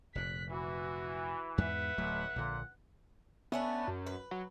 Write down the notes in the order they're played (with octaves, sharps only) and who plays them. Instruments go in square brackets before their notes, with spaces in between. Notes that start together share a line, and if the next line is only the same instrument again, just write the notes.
[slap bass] F1 A#2 [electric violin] F#6 B6
[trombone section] E3 [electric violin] F#4
[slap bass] E2 G#2 [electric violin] B4 E5 [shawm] F#5
[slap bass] D1 F#3 A3 [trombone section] B1
[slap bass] A#1 D3 [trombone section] A#2
[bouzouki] A3 C#4 D4 [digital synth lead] B3
[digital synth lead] F#2
[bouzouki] B4
[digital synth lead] F#3